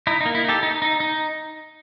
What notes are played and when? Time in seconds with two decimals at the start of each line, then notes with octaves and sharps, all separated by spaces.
0.07 D#4 E4
0.21 D#4
0.26 A#3
0.35 E4
0.45 D#4 G4 A4
0.63 D#4
0.82 D#4
1.00 D#4